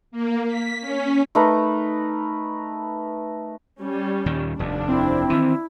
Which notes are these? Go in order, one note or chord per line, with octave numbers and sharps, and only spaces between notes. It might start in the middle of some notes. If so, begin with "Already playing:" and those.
A#3
B6
C#4
A3 D#4 A#4 B4
G3 C#4
D#2 A#2 D#3
F1 D#2 D4
C4 E4
D#3 E3